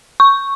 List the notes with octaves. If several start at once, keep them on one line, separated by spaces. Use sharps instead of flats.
C#6